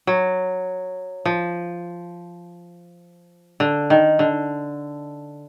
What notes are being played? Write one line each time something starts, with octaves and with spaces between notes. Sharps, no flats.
F#3
F3
D3
D#3
D3